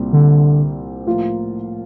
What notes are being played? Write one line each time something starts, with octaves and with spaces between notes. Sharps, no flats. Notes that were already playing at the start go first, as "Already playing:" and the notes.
Already playing: C2 A#2 G3 C4
D3
A2 F3 A#3 F4